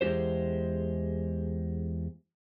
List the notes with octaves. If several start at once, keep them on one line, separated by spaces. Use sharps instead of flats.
E2 G#3 F4 G4 C5